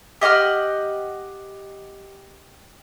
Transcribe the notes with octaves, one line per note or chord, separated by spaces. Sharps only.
G4 D#5 F#5 F6